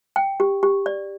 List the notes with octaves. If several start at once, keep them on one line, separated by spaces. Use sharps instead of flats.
G5
G4
G4
D5